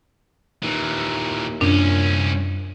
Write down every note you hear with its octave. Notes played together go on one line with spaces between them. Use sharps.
D#2 A#2 E3
C2 F#2 A#2 C#4 D4